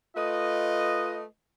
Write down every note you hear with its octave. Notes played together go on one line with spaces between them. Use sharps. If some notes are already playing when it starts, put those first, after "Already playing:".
A3 F4 B4 D#5